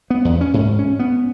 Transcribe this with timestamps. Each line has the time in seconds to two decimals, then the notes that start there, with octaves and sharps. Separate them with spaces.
0.10 B3
0.25 E2
0.41 C#4
0.54 G#2
0.79 C#4
0.99 B3